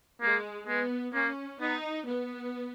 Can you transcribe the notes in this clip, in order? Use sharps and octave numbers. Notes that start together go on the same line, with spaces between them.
G#3 A#3
G#3 B3
A#3 C#4
B3 D#4
B3